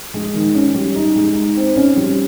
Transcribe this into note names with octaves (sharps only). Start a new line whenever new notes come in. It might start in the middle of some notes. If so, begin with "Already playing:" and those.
G#3
D#3
C#4
G3
D#4
G#3
D#4
C4
C#4
G3